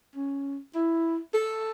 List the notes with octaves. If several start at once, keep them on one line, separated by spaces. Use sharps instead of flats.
C#4
E4
A4